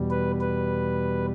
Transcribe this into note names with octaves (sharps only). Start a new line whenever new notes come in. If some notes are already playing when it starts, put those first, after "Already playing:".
Already playing: E2 B2 G3
B4
B4